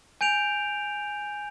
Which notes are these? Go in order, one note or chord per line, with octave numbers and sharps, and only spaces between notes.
G#5 G6 D7 F7